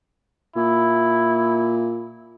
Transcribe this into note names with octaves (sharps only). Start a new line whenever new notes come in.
A#2 E4